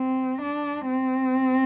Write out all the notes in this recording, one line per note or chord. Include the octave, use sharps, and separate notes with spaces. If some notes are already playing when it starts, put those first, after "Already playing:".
Already playing: C4
D4
C4